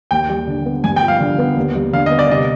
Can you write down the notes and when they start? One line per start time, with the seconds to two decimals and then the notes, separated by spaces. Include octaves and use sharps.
0.11 D#2 G5
0.29 G3
0.47 D3
0.65 B3
0.84 G2 G#5
0.96 G5
1.02 F3
1.08 F5
1.20 D3
1.39 B3
1.57 D#2
1.75 G3
1.93 D3 F5
2.06 B3 D#5
2.19 D5
2.30 C3 D#5